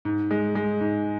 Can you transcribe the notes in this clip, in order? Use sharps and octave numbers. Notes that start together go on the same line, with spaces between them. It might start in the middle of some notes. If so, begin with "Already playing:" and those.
G#2
G#3
G#3
G#2